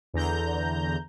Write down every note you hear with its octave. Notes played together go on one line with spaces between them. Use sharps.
E2 D3 A#5 G6